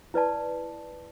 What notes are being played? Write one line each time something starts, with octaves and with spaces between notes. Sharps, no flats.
E4 B4 D5 A5